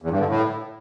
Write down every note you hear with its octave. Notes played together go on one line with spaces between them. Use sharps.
E2
G2
D3
A2